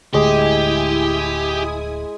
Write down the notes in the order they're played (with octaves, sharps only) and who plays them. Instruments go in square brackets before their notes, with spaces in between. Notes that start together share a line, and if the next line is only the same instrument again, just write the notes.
[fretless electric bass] D1 D3 A3 [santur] G#3 [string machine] E4 G#5 D#6 [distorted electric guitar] G4